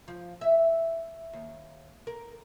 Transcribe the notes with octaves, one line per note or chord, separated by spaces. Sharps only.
F3
E5
D#2
A#4